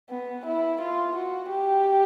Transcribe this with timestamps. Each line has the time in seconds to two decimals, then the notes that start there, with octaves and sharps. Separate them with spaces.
0.10 B3
0.45 E4
0.81 F4
1.15 F#4
1.51 G4